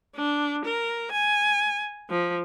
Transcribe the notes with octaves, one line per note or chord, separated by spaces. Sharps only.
D4
A#4
G#5
F3